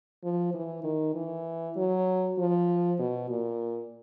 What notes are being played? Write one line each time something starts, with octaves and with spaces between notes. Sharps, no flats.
F3
E3
D#3
E3
F#3
F3
B2
A#2